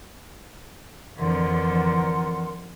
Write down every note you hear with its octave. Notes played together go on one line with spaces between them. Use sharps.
F2 D3 E3 A#4 F#5 C6